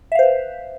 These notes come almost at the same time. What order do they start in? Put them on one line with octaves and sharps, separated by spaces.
E5 F5 C5 B4